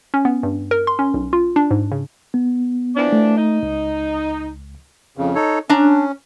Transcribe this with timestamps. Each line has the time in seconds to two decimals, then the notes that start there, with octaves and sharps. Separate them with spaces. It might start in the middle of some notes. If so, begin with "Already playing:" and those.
0.14 C#4
0.25 B3
0.43 G2
0.71 A#4
0.87 C6
0.99 C#4
1.14 B1
1.33 F4
1.56 D4
1.71 G#2
1.92 C#3
2.34 B3
2.96 E3 F3 D4
3.12 A3
3.37 D#4
3.63 C#2
5.17 F2 C#3
5.35 D#4 A4 C#5
5.69 C#4 D4 A#5